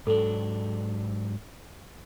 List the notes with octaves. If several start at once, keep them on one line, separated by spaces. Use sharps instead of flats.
G#2 F#3 D4 A4